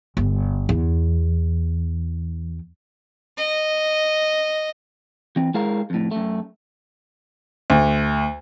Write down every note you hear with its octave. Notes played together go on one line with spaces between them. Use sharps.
G1
E2
D#5
E3 C4
G#3 E4 G#4 A#4 F5
F2 A2
F#2 A3
D2